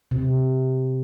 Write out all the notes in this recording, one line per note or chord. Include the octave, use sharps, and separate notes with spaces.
C3